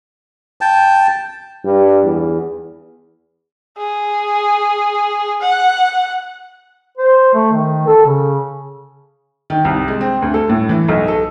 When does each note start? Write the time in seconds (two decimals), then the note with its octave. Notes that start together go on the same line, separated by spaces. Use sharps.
0.61 G5 A5
1.65 G2
2.04 E2
3.78 G#4
5.41 F#5
6.98 C5
7.34 A3
7.53 D#3
7.87 A4
8.06 C#3
9.50 D#3
9.65 C2
9.88 G#3
10.01 C4
10.22 D2
10.34 A4
10.50 A2
10.69 E3
10.88 B1
11.08 A4